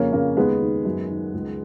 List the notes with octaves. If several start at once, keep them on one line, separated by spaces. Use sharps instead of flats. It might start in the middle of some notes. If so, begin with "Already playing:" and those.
Already playing: F2 C#3 A#3 C#4
C#3 A#3 C#4
D#2 G#3 B3
D#3
F#2
D#3
C#2